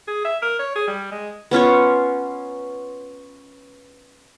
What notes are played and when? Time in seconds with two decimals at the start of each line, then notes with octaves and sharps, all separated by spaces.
0.08 G#4
0.24 E5
0.42 A#4
0.59 C#5
0.76 G#4
0.87 G3
1.11 G#3
1.51 B3 C#4 F4 C#5